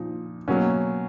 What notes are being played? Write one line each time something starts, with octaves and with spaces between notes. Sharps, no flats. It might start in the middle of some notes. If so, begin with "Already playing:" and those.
Already playing: A#2 F3 D#4
B2 F#3 A#3 C#4